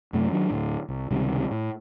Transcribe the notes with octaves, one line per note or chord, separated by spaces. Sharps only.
F#2 C3 A3
D#3 F#3 D4
D2 A2
C2
C#2 C3 D#3 G3
A2